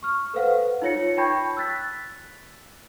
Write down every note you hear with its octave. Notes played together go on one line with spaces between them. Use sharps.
C#6 F6
A4 B4 C5 F5 F#5
D#4 F4 C#5 A#6 C#7
G5 A5 B5 C#6 G6 G#6
E6 F#6 A6 B6